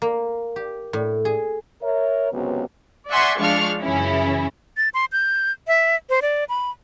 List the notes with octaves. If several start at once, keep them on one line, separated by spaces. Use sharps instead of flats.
A#3
G4
A2
G#4
A#4 C#5 E5
C#2 F#2 C3 F#3 B3
D5 E5 F#5 G#5 C6 C#6
F3 G#3 D4 F5 C#6 F6
F#2 C#3 E3 C#4 E4
A6
C6
G6
E5
C5
D5
B5